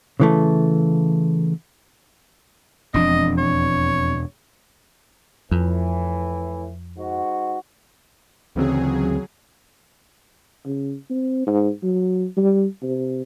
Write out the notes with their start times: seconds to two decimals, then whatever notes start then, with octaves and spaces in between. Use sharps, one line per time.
0.20 C#3 E3 A3
2.94 E1 F2 D4 D#5
3.38 C#5
5.51 F2 A2 E3
6.98 G#2 F#4
8.56 D2 C#3 E3 F#3 C4 G#4
10.65 C#3
11.10 C4
11.47 G#2
11.83 F#3
12.37 G3
12.83 C3